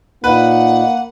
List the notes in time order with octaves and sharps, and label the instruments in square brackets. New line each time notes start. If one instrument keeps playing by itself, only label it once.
[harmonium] A#2 D#4 [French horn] A#3 [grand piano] B4 [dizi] F#5